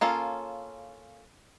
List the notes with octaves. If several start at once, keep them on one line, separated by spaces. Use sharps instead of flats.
A#3 C#4 F4 A4